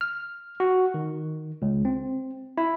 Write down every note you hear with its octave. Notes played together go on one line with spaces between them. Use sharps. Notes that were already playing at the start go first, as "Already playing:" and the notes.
F6
F#4
D#3
C#2
C4
E4